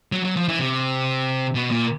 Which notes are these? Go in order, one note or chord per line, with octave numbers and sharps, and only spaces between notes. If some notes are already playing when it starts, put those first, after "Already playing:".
F#3
F#3
F3
E3
C3
B2
A#2